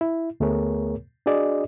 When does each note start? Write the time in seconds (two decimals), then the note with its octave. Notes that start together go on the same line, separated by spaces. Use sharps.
0.01 E4
0.40 D2 A3 B3 G#4 A#4 C#5
1.26 D4 F#4 G#4 D5 D#5